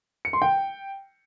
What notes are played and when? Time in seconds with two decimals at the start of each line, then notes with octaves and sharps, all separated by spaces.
0.25 C#7
0.33 C6
0.42 G5